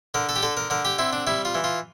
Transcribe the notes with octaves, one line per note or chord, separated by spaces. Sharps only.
D3 A#4
A4
G4
D3 A4
A#4
D3 A#4
G4
C4 E4
D4
G3 E4
F4
E3
F4